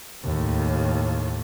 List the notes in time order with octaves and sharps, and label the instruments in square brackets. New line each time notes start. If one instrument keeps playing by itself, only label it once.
[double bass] D#2 A2